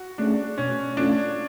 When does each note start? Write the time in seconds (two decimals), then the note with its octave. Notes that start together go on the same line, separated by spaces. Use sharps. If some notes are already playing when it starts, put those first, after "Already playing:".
Already playing: F#4
0.18 A3 C#4 D4 G#4 D5
0.58 B2 C#4
0.97 A3 C#4 D4 F4